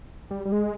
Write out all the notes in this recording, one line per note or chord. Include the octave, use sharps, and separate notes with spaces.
G3
G3
G#3